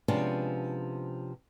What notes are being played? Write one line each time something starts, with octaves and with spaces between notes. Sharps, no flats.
C3 F3 G#3 B3 C#4 D4